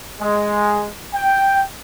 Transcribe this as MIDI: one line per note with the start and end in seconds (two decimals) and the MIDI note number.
0.20 0.90 56
1.14 1.62 79